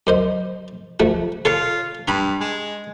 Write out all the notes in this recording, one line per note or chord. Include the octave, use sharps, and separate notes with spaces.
F#2 C5 D#5
F3 A3 F#4
F4 A4 C#5 F#5
G2 A#5 B5
G#3